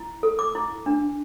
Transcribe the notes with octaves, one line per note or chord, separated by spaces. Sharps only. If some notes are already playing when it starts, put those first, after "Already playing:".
Already playing: E4
A4
D6
E4
D4